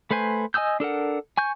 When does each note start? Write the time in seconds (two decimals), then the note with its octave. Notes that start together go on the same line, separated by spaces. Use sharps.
0.11 A3 B4 C5 G#5
0.54 D#5 G#5 D#6 E6 G6
0.80 D4 A4 A#4 F#5
1.37 G#5 C#6 G6